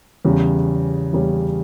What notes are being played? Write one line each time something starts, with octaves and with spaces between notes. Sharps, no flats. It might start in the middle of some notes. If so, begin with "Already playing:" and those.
E2 C#3 G3 C#4
E2 C#3 G3 C#4